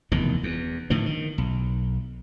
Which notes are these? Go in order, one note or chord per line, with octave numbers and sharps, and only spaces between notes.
F1 E2 B2 D#3
E2
A2 D3 D#3 F3
D#3
B1